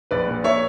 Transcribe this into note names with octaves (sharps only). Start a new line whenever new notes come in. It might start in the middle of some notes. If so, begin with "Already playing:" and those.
A#1 B4 D5
A#2
A#3 C#5 E5